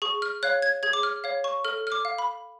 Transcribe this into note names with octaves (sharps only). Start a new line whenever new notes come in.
G#4 C#6
F6
C#5 F5 F#6
G#6
G#4 G#6
D6
F6
C#5 F5
C#6
A4 F6
F6
D6
F5
B5